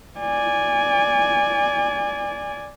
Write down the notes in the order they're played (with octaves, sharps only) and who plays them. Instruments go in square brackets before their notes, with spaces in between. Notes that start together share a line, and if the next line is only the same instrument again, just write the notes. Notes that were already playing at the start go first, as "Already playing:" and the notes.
[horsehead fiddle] D5 G#5